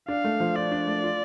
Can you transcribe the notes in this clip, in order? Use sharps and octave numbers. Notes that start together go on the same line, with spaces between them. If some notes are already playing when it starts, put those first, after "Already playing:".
D4 F5
A3
F3
F4 D5
D4
A3
F4